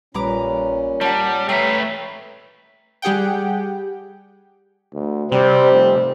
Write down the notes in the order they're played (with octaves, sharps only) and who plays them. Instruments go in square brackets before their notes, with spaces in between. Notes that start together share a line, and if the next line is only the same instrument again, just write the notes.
[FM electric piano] A#1 G3 [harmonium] A#2 C#4 [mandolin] B4 A#5 D6
[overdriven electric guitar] G3 [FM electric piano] C#5 F#5 [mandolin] A5 A#5
[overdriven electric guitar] A3 B4 [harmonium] C#5 E5 [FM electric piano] G5 C7 [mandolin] A#5
[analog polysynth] G3 G4 G#4 F#5 G5
[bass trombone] D2
[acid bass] C3 [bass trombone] G3 [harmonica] C4
[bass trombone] F1